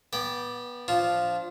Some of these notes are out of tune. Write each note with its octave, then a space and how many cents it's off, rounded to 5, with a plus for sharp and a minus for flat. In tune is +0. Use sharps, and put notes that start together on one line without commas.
B3 -20 D5 +0 G5 +0
F3 +0 D4 -25 F4 +0